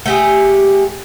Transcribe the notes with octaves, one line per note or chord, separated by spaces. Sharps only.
A3 G4 G#4